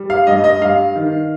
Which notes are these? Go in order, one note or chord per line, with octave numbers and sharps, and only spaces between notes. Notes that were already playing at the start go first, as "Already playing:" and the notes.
Already playing: G3
F5
G2 D#5
D#5
G2 F5
D#3